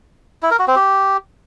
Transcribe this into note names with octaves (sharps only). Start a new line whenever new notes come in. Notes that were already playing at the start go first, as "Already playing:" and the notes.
E4
A#4
F#4
C4
G4